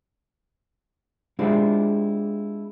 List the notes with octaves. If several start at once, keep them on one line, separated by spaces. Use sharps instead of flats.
G#3 C4 D4 E4 F4 G4